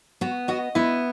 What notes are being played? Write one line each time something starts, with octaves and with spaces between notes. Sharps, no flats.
B3 F#4
F#4 D#5
B3 E4